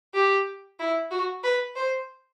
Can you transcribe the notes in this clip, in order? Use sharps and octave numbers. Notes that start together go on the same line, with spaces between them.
G4
E4
F#4
B4
C5